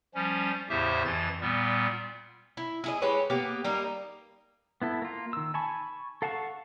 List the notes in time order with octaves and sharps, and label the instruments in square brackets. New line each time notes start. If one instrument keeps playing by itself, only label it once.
[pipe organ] F3 G3 C#4
E2 A2 C#3 G4 C5 E5
F2 E3 A6
A#2 G3 B3
[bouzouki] E4
E4 G#4 D#5
G#3 G4 B4 C#5
A#3 B3 G4
G3 A#3 D#4
[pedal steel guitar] B3 E4 A4
A#3 F4
D#3 E6
G#5 A5 B5 C#6
A4 F5 F#5 A5 C#6